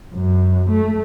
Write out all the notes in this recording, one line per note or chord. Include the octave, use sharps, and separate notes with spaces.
F#2
A3